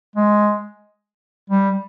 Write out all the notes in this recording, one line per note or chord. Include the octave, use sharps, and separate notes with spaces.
G#3
G3